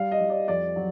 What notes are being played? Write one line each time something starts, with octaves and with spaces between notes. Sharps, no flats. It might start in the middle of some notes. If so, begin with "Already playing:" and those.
Already playing: G3 F5
D#5
G3
D5
F2 D5
F#3